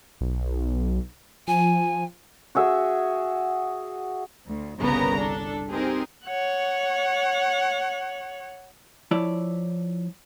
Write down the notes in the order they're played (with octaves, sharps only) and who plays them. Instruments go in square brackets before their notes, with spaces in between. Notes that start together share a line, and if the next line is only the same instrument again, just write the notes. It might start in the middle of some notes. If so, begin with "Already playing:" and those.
[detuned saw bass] B1
[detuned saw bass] F3 [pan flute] G#5
[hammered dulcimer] F#4 G#4 E5
[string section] D2
G1 C2 C#3 B3 A#4 A#5
D4 A4
C4 D#4 G4 G#4 A#4
[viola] C#5 F#5
[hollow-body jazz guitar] F3 E4 C#5 D5